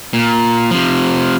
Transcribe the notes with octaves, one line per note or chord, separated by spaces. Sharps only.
A#2
C3 F3